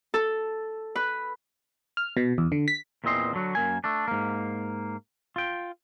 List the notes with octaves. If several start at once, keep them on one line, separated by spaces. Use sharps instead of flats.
A4
B4
F6
B2
E2
D3
B6
E2 A#2 E3 C4 D#5 C6
D3 F#3 F#4
F#2 A#3 G#5
A3 D4
G#2 A#3
F4 G5